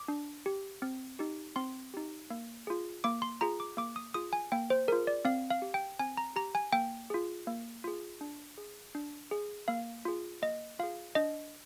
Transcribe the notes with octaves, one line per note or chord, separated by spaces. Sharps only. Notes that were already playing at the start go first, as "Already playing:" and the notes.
Already playing: D6
D4
G4
C4
D#4 G4
C4 C6
D#4 G4
A#3
F4 G#4
A#3 D6
C6
F4 G#4 A#5
D6
A#3 D6
D#6
F4 G#4 D#6
G#5
A#3 G5
C5
F4 G#4 A#4
D5
C4 F5
F5
G4
G5
C4 G#5
A#5
G4 A#5
G#5
A#3 G5
F4 G#4
A#3
F4 G#4
D4
G#4
D4
G#4
A#3 F5
F4 G#4
A#3 D#5
F4 G#4 F5
D4 D#5